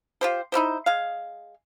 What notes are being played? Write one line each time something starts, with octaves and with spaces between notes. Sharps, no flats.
F4 G4 C5
D#4 E4 G4 C5
G#3 F5